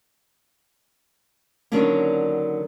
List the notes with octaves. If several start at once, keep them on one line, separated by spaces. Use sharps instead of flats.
D3 D#3 F#3 A#3 C#4 D4